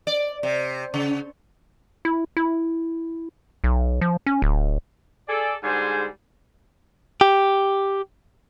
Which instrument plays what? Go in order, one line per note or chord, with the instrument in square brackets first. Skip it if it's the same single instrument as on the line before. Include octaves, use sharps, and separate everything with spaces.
[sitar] D5
C3
C#3
[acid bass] E4
E4
B1
F3
C#4
D1
[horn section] G#4 A4 D5
G#2 D3 G3 G#4 C5 G#5
[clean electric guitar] G4